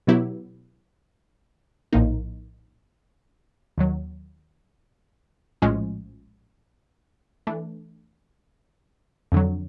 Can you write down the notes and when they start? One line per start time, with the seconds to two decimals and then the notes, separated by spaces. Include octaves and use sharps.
0.07 B2 F#3 B3 E4 G4
1.92 A#1 A2 F3 A#3 D#4
3.78 D#2 D#3 F#3
5.62 A#1 A2 F3 G#3 C#4
7.47 E3 A3 D4
9.32 F2 D3 F#3